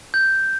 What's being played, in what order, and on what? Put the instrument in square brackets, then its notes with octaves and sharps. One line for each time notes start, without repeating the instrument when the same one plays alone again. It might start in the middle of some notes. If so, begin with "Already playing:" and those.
[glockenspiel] G6